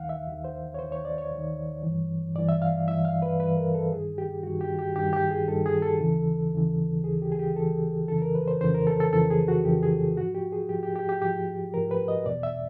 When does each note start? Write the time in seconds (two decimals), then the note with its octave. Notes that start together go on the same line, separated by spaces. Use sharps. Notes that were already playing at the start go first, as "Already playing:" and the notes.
Already playing: D#2 D#3 F5 F#5
0.09 E5
0.27 D#2 D#3
0.44 C5
0.74 C#5
0.79 D#2 D#3 C5
0.92 C#5
1.05 D5
1.18 C#5
1.31 D#2 D#3
1.83 G2 E3
2.36 G2 E3 D5
2.49 E5
2.62 F5
2.87 G2 E3 E5
3.05 F5
3.22 B4
3.39 G2 E3 B4
3.57 A#4
3.75 A4
3.92 G2 D#3 G#4
4.18 G4
4.43 G2 D#3 F#4
4.61 G4
4.79 G4
4.96 G2 D#3 G4
5.13 G4
5.31 G#4
5.48 G2 D#3 A4
5.66 G#4
5.82 A4
6.00 D#2 C#3 E3
6.52 D#2 C#3 E3
7.04 D#2 C#3 E3 G#4
7.22 G4
7.32 G#4
7.39 G4
7.56 D#2 C#3 E3 A4
8.08 F2 C#3 E3 A4
8.22 A#4
8.35 B4
8.48 C5
8.61 F2 C#3 E3 C5
8.75 A#4
8.87 A4
9.00 A4
9.13 F2 C#3 E3 A4
9.30 G#4
9.48 F#4
9.65 F2 C#3 E3 G4
9.83 G#4
10.17 G#2 F3 F#4
10.34 G4
10.52 G#4
10.69 G#2 F3 G4
10.83 G4
10.96 G4
11.09 G4
11.21 G#2 F3 G4
11.74 G#2 F3 A#4
11.91 B4
12.08 D#5
12.26 E2 B2 D5
12.43 E5